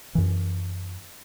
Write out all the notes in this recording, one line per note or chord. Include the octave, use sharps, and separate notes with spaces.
F#2 E3